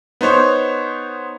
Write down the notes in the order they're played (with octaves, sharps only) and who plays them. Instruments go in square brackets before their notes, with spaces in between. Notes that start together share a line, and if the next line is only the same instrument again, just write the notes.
[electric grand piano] B3 D#4 C5 C#5